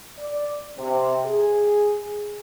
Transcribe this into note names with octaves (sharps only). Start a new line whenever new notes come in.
D5
C3
G#4